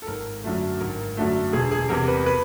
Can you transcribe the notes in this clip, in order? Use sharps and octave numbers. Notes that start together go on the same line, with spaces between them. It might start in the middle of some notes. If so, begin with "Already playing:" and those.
A4
G#1 A#4
F#2 D3 F#3 A3
G#1 A#4
F#2 D3 F#3 A3
E1 G#4
G#4
E2 C3 A#4
B4
B4